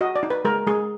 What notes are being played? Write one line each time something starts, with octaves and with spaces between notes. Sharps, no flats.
F#4 D#5
D5
D#4
B4
G#3 A#4
G#3 G#4